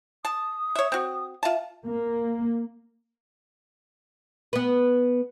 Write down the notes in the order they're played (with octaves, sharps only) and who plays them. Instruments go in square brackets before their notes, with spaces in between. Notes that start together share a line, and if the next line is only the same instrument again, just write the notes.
[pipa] A5 [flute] D#6
[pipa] C#5 E5
C4 F#4
[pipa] F4 A5 [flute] E5
[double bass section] A#3
[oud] B3 B4